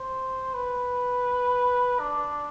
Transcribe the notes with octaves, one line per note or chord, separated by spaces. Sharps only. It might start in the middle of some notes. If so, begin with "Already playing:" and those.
Already playing: C5
B4
D4